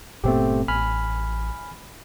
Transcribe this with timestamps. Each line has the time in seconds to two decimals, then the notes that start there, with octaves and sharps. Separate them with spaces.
0.24 G1 A#2 A3 B3 C4 G4
0.68 A1 G#5 B5 F6